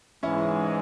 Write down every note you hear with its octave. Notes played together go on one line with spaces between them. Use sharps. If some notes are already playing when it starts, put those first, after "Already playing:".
G#2 E3 G#3 C#4 E4